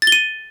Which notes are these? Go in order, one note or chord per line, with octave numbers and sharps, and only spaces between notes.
A6
G7
D#7